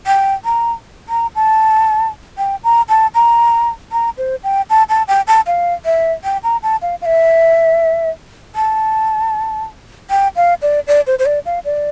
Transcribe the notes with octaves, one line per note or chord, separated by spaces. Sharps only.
G5
A#5
A#5
A5
G5
A#5
A5
A#5
A#5
C5
G5
A5
A5
G5
A5
F5
E5
G5
A#5
A5
F5
F5
E5
A5
G5
F5
D5
D5
C5
C5
D5
F5
D5